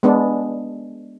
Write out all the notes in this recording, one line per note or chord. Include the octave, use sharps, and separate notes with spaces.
G#3 B3 D4